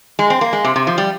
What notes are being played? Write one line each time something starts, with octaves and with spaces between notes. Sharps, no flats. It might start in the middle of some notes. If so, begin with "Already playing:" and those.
G#3
C4
A#3
G#3
C3
C3
F3
G3